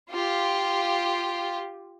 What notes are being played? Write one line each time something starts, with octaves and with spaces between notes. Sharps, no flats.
F4 G4